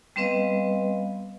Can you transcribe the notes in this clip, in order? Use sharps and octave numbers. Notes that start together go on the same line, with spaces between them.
G3 B3 C4 B4 D#5 F5